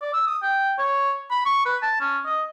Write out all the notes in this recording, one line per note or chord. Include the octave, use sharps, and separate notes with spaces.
D5
E6
D#6
G5
C#5
B5
C#6
B4
A5
C#4
D#5